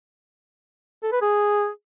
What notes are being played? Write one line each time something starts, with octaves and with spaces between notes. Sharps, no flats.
A4
B4
G#4